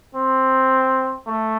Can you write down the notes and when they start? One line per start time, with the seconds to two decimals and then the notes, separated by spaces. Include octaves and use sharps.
0.15 C4
1.27 A3